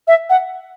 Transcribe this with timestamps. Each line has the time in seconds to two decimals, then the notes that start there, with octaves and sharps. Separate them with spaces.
0.07 E5
0.30 F#5